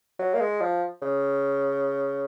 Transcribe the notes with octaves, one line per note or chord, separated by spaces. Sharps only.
F#3
A#3
G#3
F3
C#3